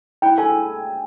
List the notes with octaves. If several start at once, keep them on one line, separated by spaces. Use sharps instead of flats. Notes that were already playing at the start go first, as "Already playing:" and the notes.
E4 G5
A4 G#5